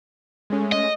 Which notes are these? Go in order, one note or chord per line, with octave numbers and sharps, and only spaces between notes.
G#3 A3 C#4
D#5